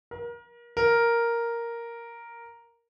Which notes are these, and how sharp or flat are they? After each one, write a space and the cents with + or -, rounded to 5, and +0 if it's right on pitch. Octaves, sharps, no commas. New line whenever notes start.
A#4 +30
A#4 +0